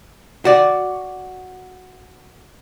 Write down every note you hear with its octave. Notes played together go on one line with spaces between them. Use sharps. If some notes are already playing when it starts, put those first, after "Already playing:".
F#4 D5